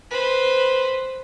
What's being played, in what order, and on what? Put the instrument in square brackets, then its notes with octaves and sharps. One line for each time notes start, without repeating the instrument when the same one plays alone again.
[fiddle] B4 C5